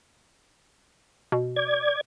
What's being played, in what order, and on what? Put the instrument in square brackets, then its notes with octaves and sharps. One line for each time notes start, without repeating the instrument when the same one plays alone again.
[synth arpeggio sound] B2
[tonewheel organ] D5 G#6